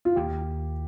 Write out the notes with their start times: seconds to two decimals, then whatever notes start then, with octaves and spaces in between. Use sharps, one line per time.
0.05 F4
0.16 D#2 D#3 A#3 G4